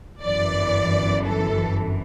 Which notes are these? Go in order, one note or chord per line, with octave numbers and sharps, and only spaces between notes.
G1 F#2 E3 D5
A4